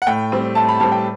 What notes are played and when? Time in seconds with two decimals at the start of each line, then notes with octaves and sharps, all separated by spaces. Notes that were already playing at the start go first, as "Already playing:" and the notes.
0.02 F#5
0.07 A2 G5
0.32 G3 C4
0.55 A2 A5
0.69 B5
0.80 G3 C4 A5
0.92 G5